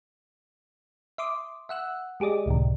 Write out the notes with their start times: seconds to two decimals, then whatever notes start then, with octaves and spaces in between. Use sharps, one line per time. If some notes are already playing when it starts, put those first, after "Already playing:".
1.18 E5 C6 D6 D#6
1.69 E5 F#5 E6 F#6
2.20 G#3 G4 G#4 D5 D#5
2.46 C#2 A2 C3 D#3